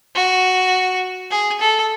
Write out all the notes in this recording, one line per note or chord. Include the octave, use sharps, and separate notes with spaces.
F#4
G#4
A4